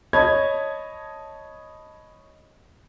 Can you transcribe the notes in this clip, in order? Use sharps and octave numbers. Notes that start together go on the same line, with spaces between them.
C#5 D#5 A5 B5 G#6